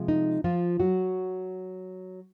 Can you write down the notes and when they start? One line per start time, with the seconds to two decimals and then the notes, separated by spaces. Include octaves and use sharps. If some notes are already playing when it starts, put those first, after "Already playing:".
Already playing: C3 F3 G#3
0.08 D#4
0.44 F3 F4
0.80 F#3 F#4